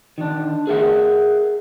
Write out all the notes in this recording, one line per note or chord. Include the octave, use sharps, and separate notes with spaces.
D#3 D4
G#4 A#4 E5 F#5